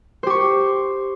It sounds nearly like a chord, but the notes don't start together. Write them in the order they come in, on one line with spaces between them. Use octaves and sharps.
C5 G4 C#6